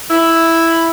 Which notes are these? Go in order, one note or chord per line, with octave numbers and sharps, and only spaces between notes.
E4